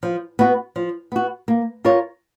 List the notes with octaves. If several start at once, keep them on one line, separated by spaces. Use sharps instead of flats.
F3
B3 F#4
F3
B3 F#4
A#3
F4 A#4 C#5